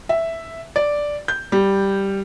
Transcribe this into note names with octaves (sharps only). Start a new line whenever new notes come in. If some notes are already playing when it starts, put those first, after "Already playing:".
E5
D5
G6
G3